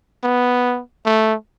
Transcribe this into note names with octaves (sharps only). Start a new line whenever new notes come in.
B3
A3